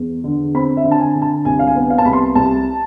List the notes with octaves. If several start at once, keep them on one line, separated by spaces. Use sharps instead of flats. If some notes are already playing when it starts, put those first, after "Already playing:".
Already playing: E2
D3
C4 B5
E5
D3
A5
G#5
D3
A5
C2 G#5
F5
G#5
B3
F5
A5
C2 B5
C6
C2 A5